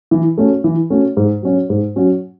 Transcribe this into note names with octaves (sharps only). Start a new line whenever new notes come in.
E3
A3 C#4 F#4
E3
A3 C#4 F#4
G#2
F#3 C#4 F#4
G#2
F#3 C#4 F#4